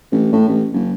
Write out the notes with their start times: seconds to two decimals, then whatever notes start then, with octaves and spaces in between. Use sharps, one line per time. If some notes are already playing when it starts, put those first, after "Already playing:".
0.12 A1
0.33 A2
0.49 A1
0.73 F#1